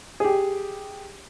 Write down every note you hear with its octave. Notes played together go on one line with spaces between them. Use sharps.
G4 G#4